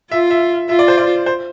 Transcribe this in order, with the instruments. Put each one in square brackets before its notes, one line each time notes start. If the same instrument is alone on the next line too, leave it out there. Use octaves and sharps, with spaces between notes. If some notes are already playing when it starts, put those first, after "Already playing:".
[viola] F4 [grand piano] E5
[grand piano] E5
[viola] F4 [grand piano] E5
[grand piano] D5
C5
D5
C5